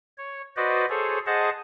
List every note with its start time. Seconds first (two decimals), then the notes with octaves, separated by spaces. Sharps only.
0.18 C#5
0.56 F#4 B4 C5 D5 D#5
0.90 G#4 A4 C5 C#5
1.26 G#4 C5 D#5 F#5 A5